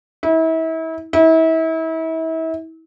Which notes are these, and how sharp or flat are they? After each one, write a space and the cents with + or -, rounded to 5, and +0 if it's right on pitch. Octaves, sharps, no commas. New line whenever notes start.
E4 -35
E4 -35